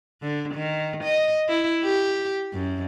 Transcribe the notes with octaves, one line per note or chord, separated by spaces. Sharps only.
D3
D#3
D#5
E4
G4
F#2